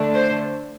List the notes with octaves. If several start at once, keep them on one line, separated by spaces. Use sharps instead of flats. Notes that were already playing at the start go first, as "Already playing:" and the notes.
Already playing: D3 A3 D4
C5